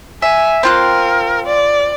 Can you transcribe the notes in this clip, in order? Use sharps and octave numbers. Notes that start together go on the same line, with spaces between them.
E5 G#5
C4 F4 A#4 F#6
D5